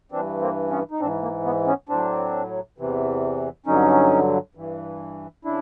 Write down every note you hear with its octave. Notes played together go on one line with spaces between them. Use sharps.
G2 E3 C4 D4
A#3 C4
B3 C#4
D#4
G#2 E3 C4 D4
A#3
B3
B3 C#4
A2 F#3 C4 D4
E2 C3 E3
G2 D3 F#3 C#4 D#4
G2 E3
C#3 D4 E4